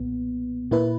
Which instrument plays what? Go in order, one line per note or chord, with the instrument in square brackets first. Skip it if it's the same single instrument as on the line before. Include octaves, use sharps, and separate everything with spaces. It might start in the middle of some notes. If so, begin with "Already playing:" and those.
Already playing: [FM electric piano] B1 A#2 B3
A#2 A#3 E4 B4